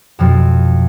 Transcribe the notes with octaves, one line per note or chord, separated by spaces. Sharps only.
F2 B2 F3 C4